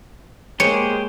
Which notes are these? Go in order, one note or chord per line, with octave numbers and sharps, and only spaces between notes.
G#3 A#3 G4 G#4 C5 C#5